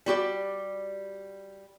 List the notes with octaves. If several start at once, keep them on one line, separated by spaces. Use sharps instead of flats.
G3 F#4 G4 D5